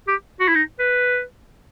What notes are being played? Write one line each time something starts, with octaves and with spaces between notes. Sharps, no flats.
G4
F#4
E4
D#4
B4